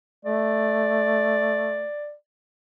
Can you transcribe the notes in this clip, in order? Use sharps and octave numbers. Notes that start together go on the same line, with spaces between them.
A3 D5